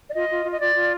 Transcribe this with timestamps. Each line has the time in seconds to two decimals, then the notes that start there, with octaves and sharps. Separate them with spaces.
0.10 D5
0.14 F4 D#5
0.30 F4
0.45 F4
0.53 D#5
0.60 F4 D5
0.75 F4